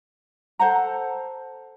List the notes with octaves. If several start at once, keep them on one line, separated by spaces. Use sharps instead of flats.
A4 C5 F#5 A#5